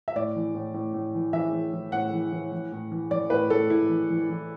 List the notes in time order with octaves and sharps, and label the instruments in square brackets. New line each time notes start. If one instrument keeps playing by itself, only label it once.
[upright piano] E5
A2 D5
E3
A2
A2
A2
E3
E3 E5
E3
E3
A2 F#5
E3
E3
E3
A2
E3
E3 D5
A2 B4
A2 A4
A2 E4
E3
E3
E3